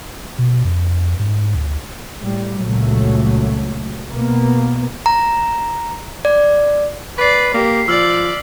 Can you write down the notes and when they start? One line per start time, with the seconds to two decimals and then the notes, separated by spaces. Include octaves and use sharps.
0.38 B2
0.65 F2
1.19 G#2
1.55 D2
2.20 A2 G3
2.62 C#2 A#2 F#3 A3
4.09 B2 A#3 B3
5.06 A#5
6.25 D5
7.18 B4 D5 B6 C7
7.54 A#3 G4
7.88 F3 D5 E6 F6 F#7